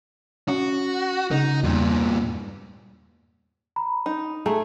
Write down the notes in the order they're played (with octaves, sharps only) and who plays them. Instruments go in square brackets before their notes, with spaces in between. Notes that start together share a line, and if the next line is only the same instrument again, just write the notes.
[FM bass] C#4 [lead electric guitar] F#4
[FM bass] C#3 [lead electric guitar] D#4
[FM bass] E2 [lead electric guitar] G2 A#2
[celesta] A#5 B5
[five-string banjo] D#4
[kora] A3 [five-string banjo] G#4 [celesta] A#5